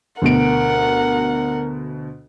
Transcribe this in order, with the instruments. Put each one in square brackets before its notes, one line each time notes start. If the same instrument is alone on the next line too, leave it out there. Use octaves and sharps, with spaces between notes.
[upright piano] D2 B2 D7 [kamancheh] A#4 F#5